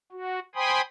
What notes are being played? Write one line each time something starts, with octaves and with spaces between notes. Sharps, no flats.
F#4
C5 G5 G#5 B5 C6 D#6